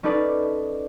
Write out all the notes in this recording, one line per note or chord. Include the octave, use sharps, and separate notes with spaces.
C#4 D#4 A4 B4 D5